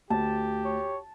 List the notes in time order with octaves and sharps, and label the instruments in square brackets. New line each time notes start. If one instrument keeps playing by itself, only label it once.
[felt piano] D2 [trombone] G4 [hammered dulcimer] A5
[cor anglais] C#5